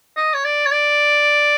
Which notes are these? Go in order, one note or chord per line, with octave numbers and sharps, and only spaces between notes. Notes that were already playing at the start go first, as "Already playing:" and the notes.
D#5
C#5
D5
C#5
D5